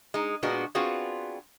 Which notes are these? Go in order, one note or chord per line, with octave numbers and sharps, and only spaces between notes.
G#3 D#4
A#2 G#3 B3 D4 F#4
B3 C4 D4 F4 F#4 G#4